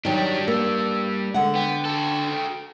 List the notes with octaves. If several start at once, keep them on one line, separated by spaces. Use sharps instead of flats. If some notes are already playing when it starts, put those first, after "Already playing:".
D#3 F#3 G3 D4 G5
A#3 E6
D3 G#3 F#5
B3 G5
F#4 A4